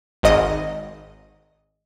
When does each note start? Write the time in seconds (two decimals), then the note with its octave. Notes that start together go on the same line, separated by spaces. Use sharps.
0.23 G#1 D#5